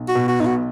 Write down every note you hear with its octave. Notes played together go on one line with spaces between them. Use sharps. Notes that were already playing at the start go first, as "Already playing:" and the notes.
Already playing: B1
F#4
B2
F#4
B1 D#4
F#4